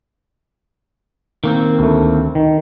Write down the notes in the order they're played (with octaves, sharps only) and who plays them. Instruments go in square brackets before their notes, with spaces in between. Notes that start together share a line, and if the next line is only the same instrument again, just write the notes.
[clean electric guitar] D#3 A#3 C4
[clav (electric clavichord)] D2 A3
D#3